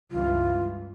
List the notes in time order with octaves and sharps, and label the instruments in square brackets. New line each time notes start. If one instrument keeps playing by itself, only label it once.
[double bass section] C#2 G2 E3 [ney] F4